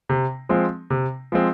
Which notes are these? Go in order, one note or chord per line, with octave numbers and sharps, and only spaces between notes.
C3
F3 G#3 C4
C3
F3 G#3 C4